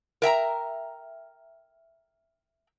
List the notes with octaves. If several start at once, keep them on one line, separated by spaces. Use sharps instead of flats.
A#4 E5 G5 A#5